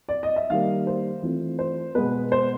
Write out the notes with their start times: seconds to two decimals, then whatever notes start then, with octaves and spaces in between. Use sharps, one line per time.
0.09 D5
0.23 D#5
0.36 E5
0.50 D#3 G3 A#3 F5
0.87 C5
1.22 E3 A3 C4 F4
1.59 C5
1.95 B2 G#3 B3 B4
2.32 C5